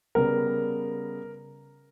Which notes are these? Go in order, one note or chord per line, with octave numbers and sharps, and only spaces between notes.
C#3 G3 B3 A#4